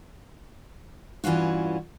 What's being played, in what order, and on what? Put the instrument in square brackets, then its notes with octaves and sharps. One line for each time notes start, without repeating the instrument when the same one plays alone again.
[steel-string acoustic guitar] G2 E3 C#4 F4 F#4